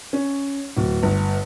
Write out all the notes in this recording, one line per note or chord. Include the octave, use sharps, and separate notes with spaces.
C#4
D1
G1